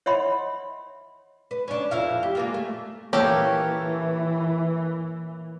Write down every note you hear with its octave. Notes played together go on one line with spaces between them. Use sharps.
C#5 D#5 E5 F#5 B5 C6
B4
C#4 D4
F2 E4 F5
G4
G#3 A#3 F4
A3
E3 A#3 G4 A4 A#4 C#5